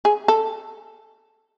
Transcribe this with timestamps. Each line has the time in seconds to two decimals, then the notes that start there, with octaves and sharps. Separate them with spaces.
0.05 G#4
0.28 A4